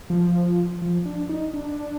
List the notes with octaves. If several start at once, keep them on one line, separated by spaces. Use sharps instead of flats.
F3
F3
D4
D#4
D4